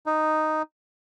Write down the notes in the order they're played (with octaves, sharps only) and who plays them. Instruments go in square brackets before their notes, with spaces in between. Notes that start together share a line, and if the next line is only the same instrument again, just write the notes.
[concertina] D#4